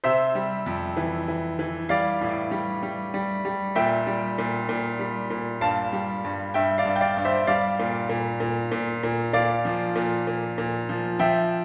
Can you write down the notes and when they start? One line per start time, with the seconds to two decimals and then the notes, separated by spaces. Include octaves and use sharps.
0.04 C3 C5 E5
0.35 G3
0.66 F2
0.97 E3
1.28 E3
1.59 E3
1.89 G3 D5 F5
2.21 A2
2.51 G3
2.83 G3
3.14 G3
3.45 G3
3.75 A#2 E5 G5
4.07 G3
4.38 A#2
4.69 A#2
4.99 G3
5.30 A#2
5.61 G2 F5 A5
5.93 G3
6.24 G2
6.54 G2 E5 G5
6.78 D5 F5
6.85 G2
6.96 G5
7.01 D5 F5
7.17 G2
7.25 C5 E5
7.47 G3 D5 F5
7.79 A#2
8.09 A#2
8.40 A#2
8.72 A#2
9.03 A#2
9.33 A#2 D5 F5
9.65 F3
9.96 A#2
10.27 A#2
10.58 A#2
10.89 F3
11.19 F3 E5 G5